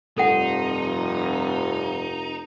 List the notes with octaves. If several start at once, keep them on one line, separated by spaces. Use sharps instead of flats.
F1 G2 F3 C4 D#4 A4 F#5